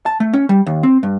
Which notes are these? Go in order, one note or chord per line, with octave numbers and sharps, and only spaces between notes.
A5
A3
C#4
G3
D#2
C4
G2